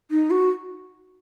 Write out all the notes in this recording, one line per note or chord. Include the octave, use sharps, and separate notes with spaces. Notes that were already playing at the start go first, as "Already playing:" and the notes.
D#4
F#4